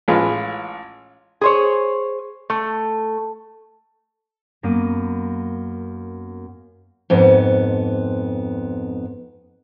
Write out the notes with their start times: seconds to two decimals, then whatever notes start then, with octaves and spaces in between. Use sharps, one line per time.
0.08 A1 G#3 F4 B4
1.41 G#4 C5 C#5
2.50 A3
4.63 F#2 A#3 B3 D#7
7.10 F2 G#2 B3